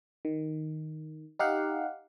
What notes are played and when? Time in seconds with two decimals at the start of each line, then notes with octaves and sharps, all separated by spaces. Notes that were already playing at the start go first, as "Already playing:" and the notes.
0.25 D#3
1.39 D#4 G4 F5 F#5